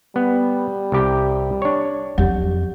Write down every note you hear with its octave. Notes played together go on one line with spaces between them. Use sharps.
G3 B3
C2 G4 G5
D4 C#5
F2 F#3 G4